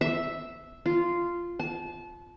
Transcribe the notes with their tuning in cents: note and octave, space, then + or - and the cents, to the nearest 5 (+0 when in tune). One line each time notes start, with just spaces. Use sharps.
E5 -5
F4 -10
A5 -30